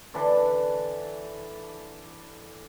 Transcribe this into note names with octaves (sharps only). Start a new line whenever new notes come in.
D3 E3 D4